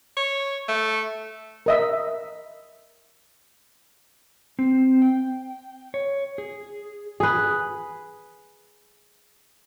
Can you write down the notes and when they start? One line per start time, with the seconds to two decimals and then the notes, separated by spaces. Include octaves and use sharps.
0.17 C#5
0.68 A3
1.66 A#4 D#5 E5
4.59 C4
5.02 G5
5.94 C#5
6.38 G#4
7.20 G#4 B4